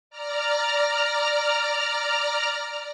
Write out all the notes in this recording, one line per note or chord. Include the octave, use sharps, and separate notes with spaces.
D5 A#5 F6